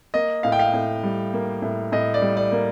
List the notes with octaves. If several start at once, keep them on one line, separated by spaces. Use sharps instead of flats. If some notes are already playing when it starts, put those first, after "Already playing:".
A#3 D#5
A2 F5
G5
F5
A2
G3
A#3
A2
A2 D#5
D5
G3
D5
A#3